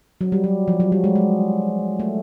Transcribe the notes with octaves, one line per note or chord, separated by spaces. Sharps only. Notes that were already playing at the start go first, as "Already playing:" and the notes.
F#3
G3
F#3
F3
F#3
G3
G#3
G#3
A3